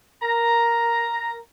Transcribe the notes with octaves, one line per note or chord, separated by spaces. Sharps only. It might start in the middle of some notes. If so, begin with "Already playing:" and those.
A#4 A#5